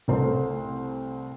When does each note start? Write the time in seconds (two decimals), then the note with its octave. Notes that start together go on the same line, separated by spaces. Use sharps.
0.08 C2 A3 A4 C5 C6